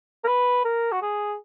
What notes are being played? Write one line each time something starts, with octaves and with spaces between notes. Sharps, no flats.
A#4
B4
A#4
F#4
G#4